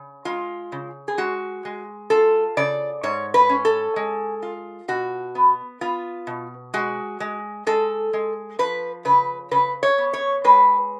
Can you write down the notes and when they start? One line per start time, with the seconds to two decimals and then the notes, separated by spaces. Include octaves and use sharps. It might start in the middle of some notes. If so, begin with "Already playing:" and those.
Already playing: C#3
0.25 G#3 F4
0.72 C#3
1.08 G#4
1.18 G#3 F#4
1.65 G#3
2.10 F4 A4
2.57 C#3 D5
3.03 G#2 C#5
3.34 B4
3.49 C#4
3.65 A4
3.96 G#3
4.43 F4
4.88 B2 F#4
5.35 B3
5.81 B3 F4
6.27 B2
6.74 G#3 F#4
7.20 G#3
7.67 G#3 A4
8.13 G#3
8.59 F3 B4
9.05 C#3 B4
9.51 C#3 B4
9.83 C#5
9.98 B3
10.13 C#5
10.44 G#3 B4